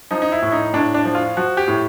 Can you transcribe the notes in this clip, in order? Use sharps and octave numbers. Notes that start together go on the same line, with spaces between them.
F3 D#4
D#4
E4
A2
D#4
A2 D4
D4
F3
F4
F3 F#4
G4
A2